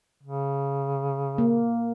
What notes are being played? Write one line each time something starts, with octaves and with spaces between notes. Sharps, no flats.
C#3
A#3